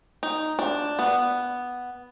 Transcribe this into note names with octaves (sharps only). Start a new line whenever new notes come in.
D#4
D4
B3